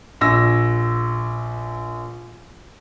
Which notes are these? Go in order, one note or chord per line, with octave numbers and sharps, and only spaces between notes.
A#1 E6 A#6